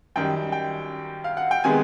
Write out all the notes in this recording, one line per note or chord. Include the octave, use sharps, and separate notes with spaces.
F#2 D#3 G3 G5
G5
F5
F#5
G5
C3 D#3 G#3 B3 G#5